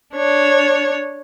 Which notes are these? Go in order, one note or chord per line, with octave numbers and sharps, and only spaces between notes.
D4 C#5